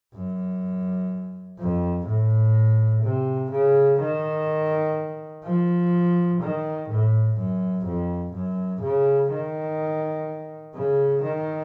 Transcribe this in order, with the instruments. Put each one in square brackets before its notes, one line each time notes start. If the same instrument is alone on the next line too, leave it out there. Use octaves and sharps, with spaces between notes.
[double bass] F#2
F2
A2
C3
C#3
D#3
F3
D#3
A2
F#2
F2
F#2
C#3
D#3
C#3
D#3